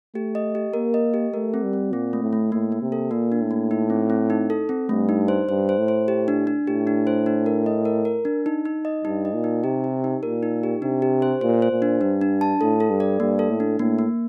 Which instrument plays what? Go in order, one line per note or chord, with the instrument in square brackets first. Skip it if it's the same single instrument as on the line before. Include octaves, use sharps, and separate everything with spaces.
[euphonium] A3 [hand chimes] G4
[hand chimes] D#5
G4
[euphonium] A#3 [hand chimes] A#4
[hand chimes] D#5
G4
[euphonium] A3 [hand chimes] A#4
[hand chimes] C4
[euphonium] G3
[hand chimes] C4
[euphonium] A#2 [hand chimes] C4
[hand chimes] A3
[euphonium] A2
[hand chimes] A3
[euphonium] A2 [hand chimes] A#3
[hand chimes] A#3
[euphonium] C3
[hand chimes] A4
[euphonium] A#2 [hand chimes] A#3
[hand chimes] D4
[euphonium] A2
[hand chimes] A#3
D#4
C4
C4
D#4
A4
C4
[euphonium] G2 [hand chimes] A3
[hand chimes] D#4
C5
[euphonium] G2 [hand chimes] C5
[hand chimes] C5
[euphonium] A2
[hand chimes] C5
G4
D4
D4
[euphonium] A2 [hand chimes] G4
[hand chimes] D4
C5
D4
A#4
D#5
A#4
A#4
D4
D#4
D#4
D#5
[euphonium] G2 [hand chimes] D#4
[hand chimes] D#5
[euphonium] A#2
[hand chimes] D#4
[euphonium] C3 [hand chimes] G4
[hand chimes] G4
D#4
[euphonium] A#2 [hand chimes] A#4
[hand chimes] D#4
G4
[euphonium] C3 [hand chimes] D4
[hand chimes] G4
C5
[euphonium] A#2 [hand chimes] C5
[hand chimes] C5
[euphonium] A#2
[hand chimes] D4
[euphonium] G2 [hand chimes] D4
[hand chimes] D4
A5
[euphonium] A2 [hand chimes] A4
[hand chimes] A4
[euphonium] G2
[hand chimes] D5
[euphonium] G2 [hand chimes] A#3
[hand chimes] A4
[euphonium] A2
[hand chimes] D4
[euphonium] A2 [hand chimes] A#3
[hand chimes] A#3